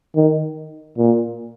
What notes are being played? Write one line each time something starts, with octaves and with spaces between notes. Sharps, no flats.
D#3
A#2